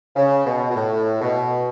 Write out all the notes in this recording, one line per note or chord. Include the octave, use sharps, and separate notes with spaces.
C#3
B2
B2
A2
B2